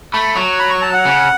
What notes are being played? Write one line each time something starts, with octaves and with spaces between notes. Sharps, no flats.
A3 B5
F#3 C#6
B5
C#6
A5
F#5
C#3